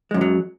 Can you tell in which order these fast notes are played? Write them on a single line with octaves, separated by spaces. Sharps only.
G#3 F#2 F3 F#3